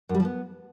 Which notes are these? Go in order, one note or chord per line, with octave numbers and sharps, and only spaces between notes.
F#2
G3
F3
B3